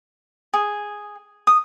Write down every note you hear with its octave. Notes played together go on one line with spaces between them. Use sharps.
G#4
D#6